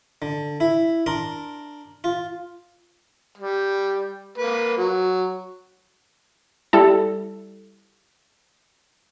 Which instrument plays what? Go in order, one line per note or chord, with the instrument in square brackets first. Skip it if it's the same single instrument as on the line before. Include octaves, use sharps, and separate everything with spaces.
[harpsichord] D3
E4
D4 A#4 C6
F4
[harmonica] G3
A#3 B4
F#3
[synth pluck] G3 E4 A4